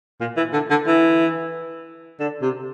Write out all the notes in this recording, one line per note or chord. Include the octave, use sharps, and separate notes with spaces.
A#2
E3
D3
D3
E3
D3
C3